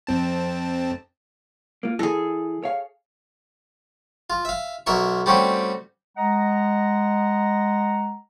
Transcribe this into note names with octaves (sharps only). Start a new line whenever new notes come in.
F2 C4 A5
A#3 F4
E3 G#4 A4
C#5 F5
F4
E5 F5
B1 A#4 E5 C#6
G3 A3 C4 C#4 F#4
G#3 D#5 F#5 A#5